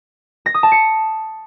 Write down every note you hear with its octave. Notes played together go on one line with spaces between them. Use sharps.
A#6
D#6
A5
C#7